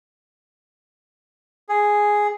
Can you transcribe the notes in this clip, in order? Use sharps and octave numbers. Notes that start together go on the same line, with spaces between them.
G#4